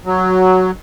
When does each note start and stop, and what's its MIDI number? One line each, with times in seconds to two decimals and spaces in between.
0.05 0.71 54